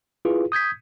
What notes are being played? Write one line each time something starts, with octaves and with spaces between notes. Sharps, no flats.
E4 F4 G#4 B4
D#6 G6 G#6 B6